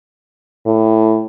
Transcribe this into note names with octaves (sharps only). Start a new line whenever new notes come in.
A2